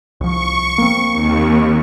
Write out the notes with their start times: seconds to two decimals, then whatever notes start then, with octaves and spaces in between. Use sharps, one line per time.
0.21 C2 F3 C#6
0.78 A#3 C4
1.13 D#2